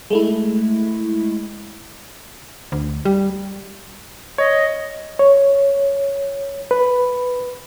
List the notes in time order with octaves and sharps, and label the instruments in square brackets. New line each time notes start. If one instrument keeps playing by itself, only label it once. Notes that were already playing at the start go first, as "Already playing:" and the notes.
[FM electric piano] G#3 A3 E4
[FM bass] D2
G3
[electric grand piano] C#5 [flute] D#5
[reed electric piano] C#5
B4